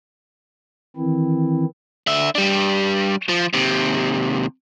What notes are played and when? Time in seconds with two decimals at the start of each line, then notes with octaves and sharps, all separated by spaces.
0.96 D#3 E3 C4 E4
2.07 D3 E5
2.35 G3 D4
3.29 F3
3.53 D#2 C3